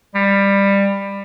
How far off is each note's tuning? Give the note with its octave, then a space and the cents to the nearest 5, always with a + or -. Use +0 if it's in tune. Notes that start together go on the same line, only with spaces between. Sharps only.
G3 +20